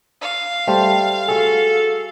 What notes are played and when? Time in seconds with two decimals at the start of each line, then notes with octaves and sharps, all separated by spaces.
0.21 F5
0.67 G3 A3 C5
1.28 F#4 G#4 A4